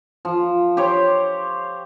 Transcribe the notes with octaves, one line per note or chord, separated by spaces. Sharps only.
F3
G4 C5 C#5